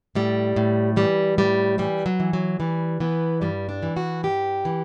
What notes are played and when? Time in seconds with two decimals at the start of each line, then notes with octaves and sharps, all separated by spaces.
0.15 A2 G3
0.56 A2
0.96 E3 G3
1.38 A2 G3
1.78 E3 G3
2.06 F#3
2.20 E3
2.33 F#3
2.60 E3 G3
3.00 E3 B3
3.42 G2 G3
3.69 D4
3.82 E3
3.97 F#4
4.23 G2 G4
4.65 E3